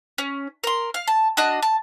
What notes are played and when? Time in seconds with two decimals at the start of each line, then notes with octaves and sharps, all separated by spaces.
0.18 C#4
0.64 A#4 C6
0.94 F5
1.08 A5
1.37 D4 F#4 D#5
1.62 A5